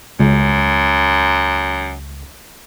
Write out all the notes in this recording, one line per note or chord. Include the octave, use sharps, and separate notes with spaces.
C#2 F#2